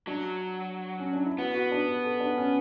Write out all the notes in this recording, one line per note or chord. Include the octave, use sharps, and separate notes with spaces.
F#3 D4
C#4
D4
E4
B3 F#4
F#4
D4
G4
A4
D4
C#4